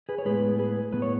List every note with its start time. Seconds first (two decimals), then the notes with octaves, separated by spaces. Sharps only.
0.09 G#4 B4
0.18 C#5
0.25 A2 G#3 B3 G#4 B4
0.59 G#4 B4
0.92 A2 G#3 B3 B4
1.02 C#5